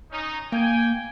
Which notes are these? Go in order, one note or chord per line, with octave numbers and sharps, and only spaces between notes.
C#4 D#4
A#3 G5 G#5